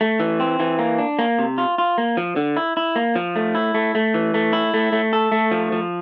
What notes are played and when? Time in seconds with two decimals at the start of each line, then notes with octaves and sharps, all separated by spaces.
0.01 A3
0.20 E3
0.40 C4
0.60 E3
0.79 A#3
0.98 D4
1.19 A#3
1.39 C3
1.58 F4
1.78 F4
1.98 A#3
2.17 F3
2.36 D3
2.57 E4
2.77 E4
2.96 A#3
3.16 F3
3.36 A3
3.55 E4
3.74 A3
3.95 A3
4.14 E3
4.34 A3
4.53 E4
4.74 A3
4.92 A3
5.13 A4
5.32 A3
5.51 F3
5.72 F3